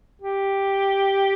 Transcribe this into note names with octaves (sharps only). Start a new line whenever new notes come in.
G4